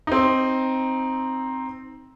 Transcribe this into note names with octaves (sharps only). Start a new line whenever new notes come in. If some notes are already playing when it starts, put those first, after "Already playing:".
C4 D#4